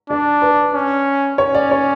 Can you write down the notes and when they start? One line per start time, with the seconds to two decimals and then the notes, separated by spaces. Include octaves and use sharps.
0.10 D4 D5
0.42 B4
0.74 C#4
1.38 C#4 C#5
1.55 D5
1.71 C#5